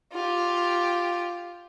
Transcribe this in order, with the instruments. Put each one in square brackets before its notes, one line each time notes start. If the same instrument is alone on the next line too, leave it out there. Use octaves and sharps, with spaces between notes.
[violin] F4 G4